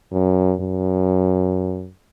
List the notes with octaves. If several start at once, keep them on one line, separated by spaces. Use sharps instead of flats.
F#2
F#2